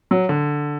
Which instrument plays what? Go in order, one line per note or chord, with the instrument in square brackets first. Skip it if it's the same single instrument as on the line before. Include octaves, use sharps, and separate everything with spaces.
[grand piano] F#3
D3